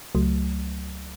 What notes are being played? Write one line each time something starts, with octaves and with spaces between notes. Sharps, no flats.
C#2 F#3 A3